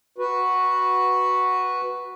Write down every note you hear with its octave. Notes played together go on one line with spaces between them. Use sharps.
F#4 B4